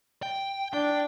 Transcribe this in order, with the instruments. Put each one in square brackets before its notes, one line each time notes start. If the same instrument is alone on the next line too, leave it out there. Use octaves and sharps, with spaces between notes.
[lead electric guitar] G5
[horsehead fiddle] D4 [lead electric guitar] G5